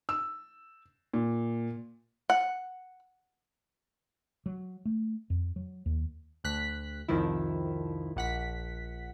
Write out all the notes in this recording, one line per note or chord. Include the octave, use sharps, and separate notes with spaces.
E6
A#2
F#5
F#3
A3
F2
F#3
D#2
D2 F#6 B6
C2 F2 D#3 F3 E4
A#1 F#5 B6